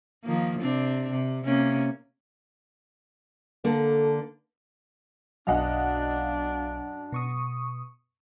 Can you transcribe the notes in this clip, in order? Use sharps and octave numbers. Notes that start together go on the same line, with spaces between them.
D#3 F3 A#3
C3 C4 D4
C3
C3 A#3 C#4
D3 A#3 A4
B1 F#2 B2 D4 D#5 F5 F#5
B2 C#6 D#6